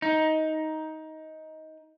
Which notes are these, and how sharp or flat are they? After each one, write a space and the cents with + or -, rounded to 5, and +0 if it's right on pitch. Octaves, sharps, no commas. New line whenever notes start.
D#4 +15